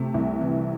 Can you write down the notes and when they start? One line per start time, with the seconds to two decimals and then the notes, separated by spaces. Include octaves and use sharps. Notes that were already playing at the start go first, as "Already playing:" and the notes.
Already playing: C3 A3
0.14 C2
0.41 E3